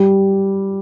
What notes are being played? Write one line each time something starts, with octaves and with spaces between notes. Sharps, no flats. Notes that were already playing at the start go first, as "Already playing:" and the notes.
Already playing: G3